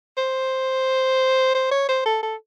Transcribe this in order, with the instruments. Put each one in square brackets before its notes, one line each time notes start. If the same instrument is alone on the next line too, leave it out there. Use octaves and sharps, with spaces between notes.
[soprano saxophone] C5
C5
C#5
C5
A4
A4